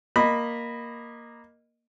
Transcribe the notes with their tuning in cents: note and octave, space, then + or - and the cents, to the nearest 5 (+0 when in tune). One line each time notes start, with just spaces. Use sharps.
A#3 +5 D#5 -15 B5 +0